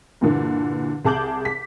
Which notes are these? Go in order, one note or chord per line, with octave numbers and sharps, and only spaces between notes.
G2 A#2 D3 E3
C2 G#4 A5 D6 G6 F#7
B6